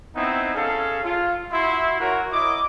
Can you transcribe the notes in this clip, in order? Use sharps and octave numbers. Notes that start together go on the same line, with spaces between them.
B3 C4 D#4 E4
C#4 G#4 A4 F5
F4
E4 F#4 E5 C6
F#4 A#4 C#5
E4 D#5 D6